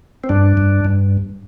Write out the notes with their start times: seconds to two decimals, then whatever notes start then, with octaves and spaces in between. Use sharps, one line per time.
0.24 C4
0.29 G2 D4
0.57 G2
0.85 G2